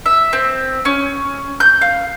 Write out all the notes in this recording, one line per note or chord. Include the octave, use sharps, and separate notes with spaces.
E5
C4
C#4
G6
F5